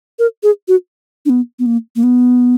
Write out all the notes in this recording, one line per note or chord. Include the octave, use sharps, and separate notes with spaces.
A#4
G#4
F#4
D4
B3
B3
A#3
A#3
B3